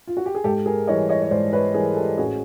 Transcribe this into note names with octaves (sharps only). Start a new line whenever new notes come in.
F4
F#4
G4
G#4
G#2 G4 A4
G#4 A#4
E3 G3 C#5 D#5
C#5 D#5
C#5
G#2 C5 D5
B4 C#5
E3 G3 G#4 A#4
G4 A4
A1 F#4 G#4